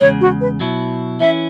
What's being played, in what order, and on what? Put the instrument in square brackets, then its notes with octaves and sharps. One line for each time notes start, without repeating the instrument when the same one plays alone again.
[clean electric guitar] E2 C#3 G#3 [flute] C#5
[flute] F#4
B4
[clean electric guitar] B2 F#3 E4
[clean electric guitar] E3 C#4 E4 [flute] E5